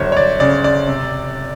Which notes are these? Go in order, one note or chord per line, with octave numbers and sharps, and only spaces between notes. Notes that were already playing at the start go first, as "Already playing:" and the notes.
Already playing: G1 F#3 C5 C#5
C#5
D5
C#3 D5
D5
C3